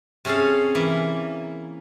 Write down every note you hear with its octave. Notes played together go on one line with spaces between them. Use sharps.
C3 C#4 G#4 A4 F5
E3 A#3